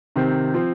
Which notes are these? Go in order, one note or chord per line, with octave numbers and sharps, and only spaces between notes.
C3 D#3 C4
F3 C4